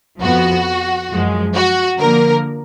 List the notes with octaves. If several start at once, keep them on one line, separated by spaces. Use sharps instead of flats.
F2 F3 B3 F#4
F#2 F3 G#3
F#4
D3 F3 A#3 A#4